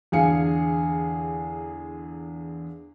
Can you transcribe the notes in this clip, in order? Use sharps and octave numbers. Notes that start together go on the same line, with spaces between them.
E2 D3 G#4 F5 G#5 C#7